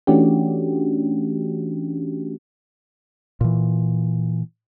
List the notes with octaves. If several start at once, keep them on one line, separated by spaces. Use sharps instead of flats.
E3 A3 C#4 D4 F#4 G4
A#2 E3